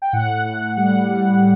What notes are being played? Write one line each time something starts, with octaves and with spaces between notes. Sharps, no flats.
G5
A2 F#5
A2
G3 F#5
G3